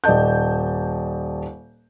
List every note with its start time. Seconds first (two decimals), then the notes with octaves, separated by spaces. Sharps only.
0.04 D#1 D5 D#5 A5 G6